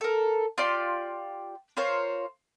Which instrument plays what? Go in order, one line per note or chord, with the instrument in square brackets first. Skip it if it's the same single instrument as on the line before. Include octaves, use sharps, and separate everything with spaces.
[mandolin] A4 A#4
F4 G4 D5 C6
F4 A#4 C5 C#5